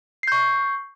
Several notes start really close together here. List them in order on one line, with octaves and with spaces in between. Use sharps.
C7 G6 C#6